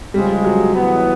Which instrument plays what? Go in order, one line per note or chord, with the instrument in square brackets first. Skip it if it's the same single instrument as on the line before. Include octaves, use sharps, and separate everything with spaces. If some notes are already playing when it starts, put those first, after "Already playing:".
[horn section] C#3 F3 G#3 [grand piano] G3
[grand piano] F#3
[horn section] A2 E3 G#3 B3